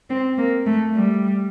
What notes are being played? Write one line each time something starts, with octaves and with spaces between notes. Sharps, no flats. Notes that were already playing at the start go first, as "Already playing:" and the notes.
C4
A#3
A3
G3